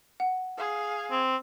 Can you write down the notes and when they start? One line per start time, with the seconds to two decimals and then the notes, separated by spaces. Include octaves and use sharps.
0.20 F#5
0.58 G#4 F5
1.11 C4